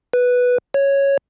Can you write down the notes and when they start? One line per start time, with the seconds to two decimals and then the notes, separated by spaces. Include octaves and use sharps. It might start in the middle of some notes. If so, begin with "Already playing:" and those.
0.13 B4
0.74 C#5